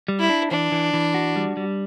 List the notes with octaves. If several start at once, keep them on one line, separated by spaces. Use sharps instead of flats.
G3
E4
D4
E3 D4
E3
E3
F#4
G3
G3